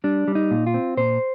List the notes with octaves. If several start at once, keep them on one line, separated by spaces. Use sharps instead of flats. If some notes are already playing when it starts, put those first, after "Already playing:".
G3 D4
G3
D#4
A#2
F4
C4
A#2 C5